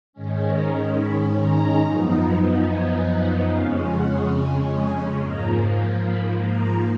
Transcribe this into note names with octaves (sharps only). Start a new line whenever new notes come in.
G#2 D#3 G#3 C#4
A#5
B5
A#5
F#2 F3 B3 D#4
G#5
F#5
F2 C#3 G#3 C#4 F5
F#5
G#5
G#5
G#2 F3 A#3 A#5
B5
A#5